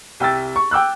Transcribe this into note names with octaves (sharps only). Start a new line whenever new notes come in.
C2 G5 E6 A6
C#6
G5 D6 E6 F#6